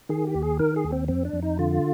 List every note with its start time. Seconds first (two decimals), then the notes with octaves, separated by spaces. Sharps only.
0.09 D#3 G#4
0.27 G4
0.35 D#2
0.42 G#4
0.59 D#3 A#4
0.76 G#4
0.84 D#2
0.92 C4
1.08 F2 C4
1.25 D4
1.33 F2
1.42 D#4
1.59 D3 F4